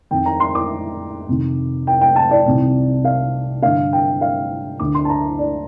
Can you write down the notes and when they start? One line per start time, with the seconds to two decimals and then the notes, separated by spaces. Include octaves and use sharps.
0.11 F2 D#3 G5
0.26 A#5
0.40 C6
0.55 D6
1.28 F2 C3 D#3
1.87 G5
2.01 G5
2.16 A5
2.31 D5
2.46 C2 C3 D#3
3.05 F5
3.62 G2 D3 F5
3.93 G5
4.21 F5
4.80 D2 D3 D6
4.95 C6
5.05 A5
5.09 A#5
5.39 D5